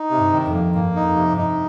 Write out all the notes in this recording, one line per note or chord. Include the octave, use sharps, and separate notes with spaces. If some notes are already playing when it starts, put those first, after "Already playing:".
Already playing: D#4
C3
G2
D#3
F2
A#3
G2 A#3
D#4
F2
C3
G2
D#4